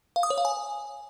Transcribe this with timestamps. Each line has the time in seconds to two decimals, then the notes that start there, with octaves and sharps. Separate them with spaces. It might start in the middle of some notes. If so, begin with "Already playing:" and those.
0.16 F5
0.23 D#6
0.30 C#5
0.38 F5
0.45 G#5